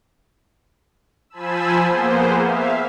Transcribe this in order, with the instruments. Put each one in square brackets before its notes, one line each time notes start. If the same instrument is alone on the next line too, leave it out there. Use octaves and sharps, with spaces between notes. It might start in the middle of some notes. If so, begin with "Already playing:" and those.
[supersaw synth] F3 C5 G#5 A5 B5 E6
A#3 B3 G#4 C5
E5 F5